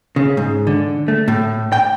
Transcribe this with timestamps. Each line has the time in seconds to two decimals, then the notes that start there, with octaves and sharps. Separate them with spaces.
0.16 C#3
0.37 G#2
0.67 D3
1.08 A3
1.28 A2
1.72 G5